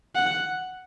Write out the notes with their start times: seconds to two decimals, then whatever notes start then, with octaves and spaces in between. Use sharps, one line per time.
0.15 F#5